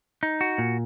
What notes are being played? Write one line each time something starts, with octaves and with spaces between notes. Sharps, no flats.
D#4
F#4
A#2